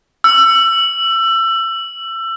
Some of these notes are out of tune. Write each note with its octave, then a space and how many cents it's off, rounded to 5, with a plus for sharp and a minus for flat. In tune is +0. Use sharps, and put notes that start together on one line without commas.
E6 +25